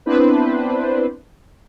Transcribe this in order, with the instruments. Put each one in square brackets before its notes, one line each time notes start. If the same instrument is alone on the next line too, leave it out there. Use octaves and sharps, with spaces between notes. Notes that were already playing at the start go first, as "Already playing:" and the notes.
[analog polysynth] B3 C4 D4 E4 B4 C5